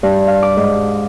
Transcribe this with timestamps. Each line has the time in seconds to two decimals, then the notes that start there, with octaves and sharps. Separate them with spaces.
0.03 G2
0.27 F5
0.42 D6
0.57 G#2